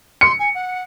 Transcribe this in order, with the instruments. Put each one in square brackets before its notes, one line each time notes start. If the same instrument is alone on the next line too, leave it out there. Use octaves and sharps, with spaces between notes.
[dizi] C6 [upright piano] C#7
[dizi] G#5
F#5